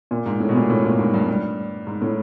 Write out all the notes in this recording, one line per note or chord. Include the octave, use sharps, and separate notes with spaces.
A#2
G#2
A2
B2
A#2
A2
A#2
G#2
G2
G2
G#2
A2